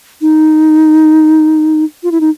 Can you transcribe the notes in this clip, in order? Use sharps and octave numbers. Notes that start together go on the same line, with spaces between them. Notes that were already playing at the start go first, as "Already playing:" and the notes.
D#4
F4
E4
D#4